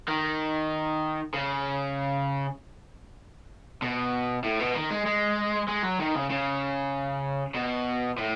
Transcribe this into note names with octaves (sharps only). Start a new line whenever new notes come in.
D#3
C#3
B2
A2
B2
D#3
G#3
G#3
G#3
F#3
D#3
C#3
C#3
B2
A2